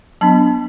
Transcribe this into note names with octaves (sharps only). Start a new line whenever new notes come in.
F#3 B3 D4 A5